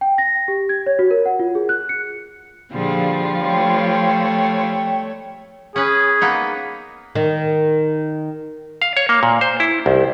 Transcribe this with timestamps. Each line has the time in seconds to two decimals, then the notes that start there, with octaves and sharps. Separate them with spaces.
0.01 G5
0.18 A#6
0.48 G4
0.69 G#6
0.86 C#5
0.99 F#4
1.11 A#4
1.26 F#5
1.39 F4
1.55 G#4
1.69 F#6
1.89 C#7
2.72 A#2 D3 F3 G3 F4 G#4
3.44 A3 C#5 G5
5.76 C#4 G#4 B4
6.21 A#3 B3 D#4
7.15 D#3
8.82 F5
8.97 C#5
9.09 A#3
9.23 A#2
9.41 C5
9.60 E4
9.86 C2